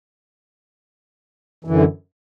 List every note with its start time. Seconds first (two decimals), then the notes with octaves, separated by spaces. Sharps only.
1.64 E3
1.67 F#2
1.70 D3